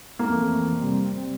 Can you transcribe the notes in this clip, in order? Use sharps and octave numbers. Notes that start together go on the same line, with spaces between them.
F2 E3 A3 A#3 C4
C3 G3 C4